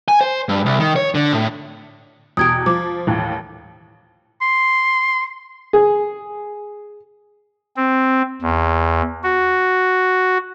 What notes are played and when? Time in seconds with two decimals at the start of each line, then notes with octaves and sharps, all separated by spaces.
0.08 G#5
0.21 C5
0.49 G2
0.66 C2
0.80 D#3
0.96 C#5
1.15 D3
1.33 A2
2.37 E2 B2 G4 D#6 G#6 D7
2.66 F3 D6
3.07 D#2 A2 E3
4.41 C6
5.73 G#4
7.77 C4
8.42 E2
9.24 F#4